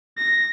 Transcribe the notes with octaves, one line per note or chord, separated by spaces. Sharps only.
A#6